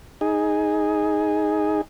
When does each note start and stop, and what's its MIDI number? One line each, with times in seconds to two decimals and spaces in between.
0.21 1.81 63
0.21 1.81 68